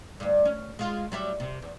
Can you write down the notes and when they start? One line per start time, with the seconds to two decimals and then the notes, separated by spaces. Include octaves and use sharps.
0.20 D2 G2
0.45 C#4
0.79 G#3 F4
1.12 F#3 G3 E4
1.40 C3
1.62 E2